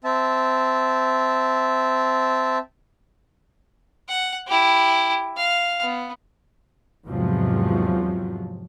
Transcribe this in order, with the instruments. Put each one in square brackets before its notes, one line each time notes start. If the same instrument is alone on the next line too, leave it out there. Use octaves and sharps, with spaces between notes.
[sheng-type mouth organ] C4 E5 A5
[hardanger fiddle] F#5
E4 G4
F5
B3
[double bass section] E2 G#2 C3 F3 F#3